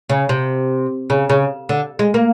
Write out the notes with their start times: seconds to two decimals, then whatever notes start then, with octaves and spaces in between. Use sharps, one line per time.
0.09 C#3
0.29 C3
1.10 C#3
1.30 C#3
1.69 D3
1.99 G#3
2.14 A#3